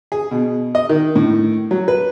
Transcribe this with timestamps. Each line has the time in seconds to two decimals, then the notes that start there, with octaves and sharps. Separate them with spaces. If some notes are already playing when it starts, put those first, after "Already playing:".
0.12 G#4
0.31 B2
0.75 D#5
0.89 D#3
1.16 A2
1.71 F#3
1.88 B4